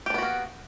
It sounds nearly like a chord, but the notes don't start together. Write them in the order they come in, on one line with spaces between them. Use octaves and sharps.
G4 D4 B3 F#4 A#3